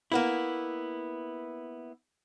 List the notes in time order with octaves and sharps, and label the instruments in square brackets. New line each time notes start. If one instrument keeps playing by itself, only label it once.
[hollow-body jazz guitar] A#3 B3 E4